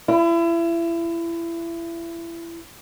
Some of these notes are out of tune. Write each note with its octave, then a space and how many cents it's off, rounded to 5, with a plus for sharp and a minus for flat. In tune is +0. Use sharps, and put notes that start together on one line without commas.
E4 +30